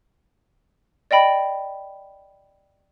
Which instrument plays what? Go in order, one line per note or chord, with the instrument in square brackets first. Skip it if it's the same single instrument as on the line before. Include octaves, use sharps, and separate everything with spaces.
[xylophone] D5 D#5 G5 B5